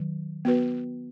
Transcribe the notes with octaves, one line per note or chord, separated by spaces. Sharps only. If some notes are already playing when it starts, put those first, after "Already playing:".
Already playing: D#3 F#3
B3 F#4 B4